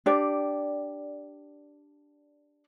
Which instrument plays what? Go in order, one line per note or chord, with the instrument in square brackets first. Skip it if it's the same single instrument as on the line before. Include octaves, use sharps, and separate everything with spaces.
[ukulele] D4 G4 D5